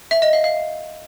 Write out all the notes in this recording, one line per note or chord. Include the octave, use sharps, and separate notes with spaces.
E5
D#5
F5
F5